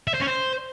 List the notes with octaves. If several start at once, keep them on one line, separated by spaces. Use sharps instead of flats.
E5
C5
C#4
C5